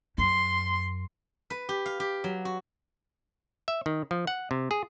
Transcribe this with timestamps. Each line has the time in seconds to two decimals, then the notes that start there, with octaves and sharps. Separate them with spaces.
0.18 F#2 C6
1.50 B4
1.69 G4
1.86 F5
2.00 G4
2.24 F#3
2.45 F#4
3.68 E5
3.86 D#3
4.11 F3
4.27 F#5
4.51 C3
4.71 G#4